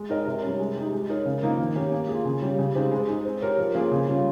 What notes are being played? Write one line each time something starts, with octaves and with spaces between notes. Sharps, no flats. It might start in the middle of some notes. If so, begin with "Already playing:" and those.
Already playing: G#3
D#4 A#4 D#5
C3
G3 C#4
G#3
D#4 G4
G#3
D#4 A#4 C#5
C#3
F3 A#3 D#4 A#4
D#3
A#3 C#4 G4
A#3
F4 G#4
C#3
G3 C#4 G4
C#3
G#3 C4 D#4 G4
G#3
D#4 G#4
C4
G4 A#4 C#5
F3
A#3 C#4 F4 G#4
C#3
G3 C#4 F4